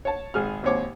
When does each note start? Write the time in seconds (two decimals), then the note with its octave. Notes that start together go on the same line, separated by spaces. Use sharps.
0.05 C#5 A5
0.34 G#1 G#4 F6
0.63 G#1 D#2 C4 C#5 D6